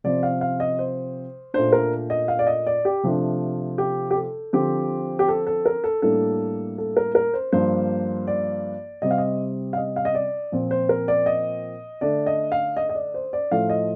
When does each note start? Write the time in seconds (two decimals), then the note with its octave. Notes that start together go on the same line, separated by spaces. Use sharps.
0.04 C3 F3 C4 D5
0.23 F5
0.41 F5
0.60 D#5
0.79 C5
1.54 A#2 A3 D4 C5
1.73 A#4
2.10 D#5
2.28 F5
2.39 D5
2.47 D#5
2.66 D5
2.85 G4
3.03 C3 F3 A3 D4
3.78 G4
4.11 G4
4.16 A4
4.53 D3 F3 C4 G4
5.19 G4
5.28 A4
5.47 A4
5.66 A#4
5.84 A4
6.02 A2 G3 A#3 D4 A4
6.78 A4
6.97 A#4
7.15 A#4
7.34 C5
7.52 G2 F3 A#3 D4 C5
8.27 D5
9.02 C3 G3 C4 D#5
9.11 F5
9.18 D#5
9.73 F5
9.77 D#5
9.96 F5
10.05 D#5
10.15 D5
10.52 A#2 F3 C4
10.71 C5
10.89 A#4
11.08 D5
11.26 D#5
12.01 D3 A3 D4 D5
12.26 D#5
12.52 F5
12.77 D#5
12.89 D#5
12.95 D5
13.14 C5
13.33 D5
13.51 A2 F3 A3 F5
13.70 D#5